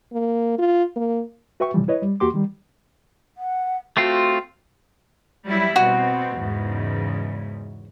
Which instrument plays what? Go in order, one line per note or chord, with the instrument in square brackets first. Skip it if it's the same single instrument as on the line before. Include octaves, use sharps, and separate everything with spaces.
[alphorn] A#3
F4
A#3
[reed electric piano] F#4 B4 E5 G5 C#6
A2 C3 E3 F3 G3
E4 B4 C#5 D#5
G3
E2 A#3 F#4 G4 C6 D6
D#3 G3
[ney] F#5
[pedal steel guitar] A3 C4 F4 [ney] F#4
[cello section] F#3 G3 E4
[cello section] B2 C4 [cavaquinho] F#4
[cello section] E2 G#2 C#3